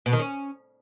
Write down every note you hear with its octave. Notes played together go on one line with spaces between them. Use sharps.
B2
D#3
C#4